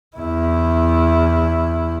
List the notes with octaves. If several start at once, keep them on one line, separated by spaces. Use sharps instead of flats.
E2 E4